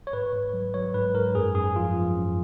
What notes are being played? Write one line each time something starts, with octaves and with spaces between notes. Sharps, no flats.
C#5
G#2 B4
G#2
F#3
F#3 C#5
G#2 B4
G#2 A#4
F#2 G#4
F#2 G#4
F3 F4
F3
F#2